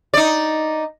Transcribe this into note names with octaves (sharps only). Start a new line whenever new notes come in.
D#4 D5